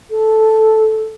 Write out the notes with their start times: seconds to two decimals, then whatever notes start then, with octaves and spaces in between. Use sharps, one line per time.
0.10 A4